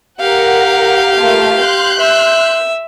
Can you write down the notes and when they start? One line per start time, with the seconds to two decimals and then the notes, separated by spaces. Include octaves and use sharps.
0.20 G4 A#4 F5 F#5
1.15 A3 A#3 F4
1.61 C6 F#6 G6
1.99 E5